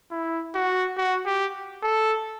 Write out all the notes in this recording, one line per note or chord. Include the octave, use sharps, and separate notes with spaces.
E4
F#4
F#4
G4
A4